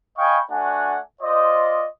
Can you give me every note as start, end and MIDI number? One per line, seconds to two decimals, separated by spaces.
0.18 0.39 75
0.18 0.39 77
0.18 0.39 79
0.18 0.39 80
0.18 0.39 83
0.18 0.39 85
0.50 0.97 57
0.50 0.97 62
0.50 0.97 66
0.50 0.97 78
0.50 0.97 80
1.22 1.85 65
1.22 1.85 72
1.22 1.85 74
1.22 1.85 75